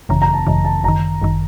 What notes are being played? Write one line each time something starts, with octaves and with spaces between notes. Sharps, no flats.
G#1 F#2 C#3 E3 A#5
A#5
A5
G#1 F#2 C#3 E3 D#5
A5
G1 F#2 D#3 A#5
G1 F#2 D#3